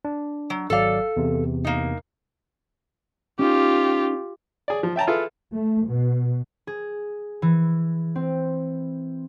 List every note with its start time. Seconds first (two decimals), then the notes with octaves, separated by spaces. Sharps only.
0.05 D4
0.50 F#3
0.70 G#1 F#3 A4 D5 F5
1.17 E2 C3
1.65 A#3 D#4
3.39 C#4 D#4 F4 G4
4.68 G#4 D5
4.83 F3
4.96 E5 G5 A5 A#5
5.07 E4 F4 G#4 A4 B4 F5
5.54 A3
5.88 B2
6.67 G#4
7.42 E3
8.16 C4